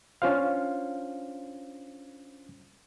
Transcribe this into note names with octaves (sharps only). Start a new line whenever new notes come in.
C#4 D4 F4 C5 F5